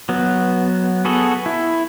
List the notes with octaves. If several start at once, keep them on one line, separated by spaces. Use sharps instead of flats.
F#3 B3
B3 F#4 G#4 A4
E4